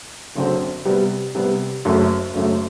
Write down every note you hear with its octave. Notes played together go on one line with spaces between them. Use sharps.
F#1 F#2 D3 F#3 C4
C3 G3 B3
C3 G3 B3
F#1 F#2 F#3 A3
F#1 F#2 F#3 A3